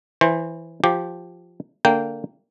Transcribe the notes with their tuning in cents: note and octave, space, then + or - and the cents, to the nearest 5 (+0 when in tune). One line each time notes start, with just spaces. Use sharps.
E3 +0 C5 +20
F3 +0 G4 +0
D3 -10 A#3 -15 G5 -5